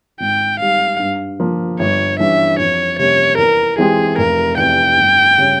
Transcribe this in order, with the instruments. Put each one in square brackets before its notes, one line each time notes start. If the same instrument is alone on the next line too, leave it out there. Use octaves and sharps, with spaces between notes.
[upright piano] G#1 [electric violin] G5
[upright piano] G#2 G3 [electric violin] F5
[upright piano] G2
F3 A#3
[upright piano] G1 [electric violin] C#5
[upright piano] G2 E3 G3 C#4 [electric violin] E5
[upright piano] F2 [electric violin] C#5
[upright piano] C3 G3 A#3 C#4 [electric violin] C#5
[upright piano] E2 [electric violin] A#4
[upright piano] E3 G#3 C4 G4 [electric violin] G#4
[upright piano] F1 [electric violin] A#4
[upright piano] E2 C3 [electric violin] G5
[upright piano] G1
C#3 G3 C#4